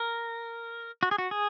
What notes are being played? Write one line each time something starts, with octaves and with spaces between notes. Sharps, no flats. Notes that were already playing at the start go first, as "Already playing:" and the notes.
Already playing: A#4
F#4
G#4
F#4
G#4